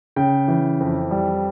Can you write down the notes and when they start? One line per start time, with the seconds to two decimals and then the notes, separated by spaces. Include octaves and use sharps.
0.16 C#3 G5
0.48 E3
0.80 F2
1.11 G3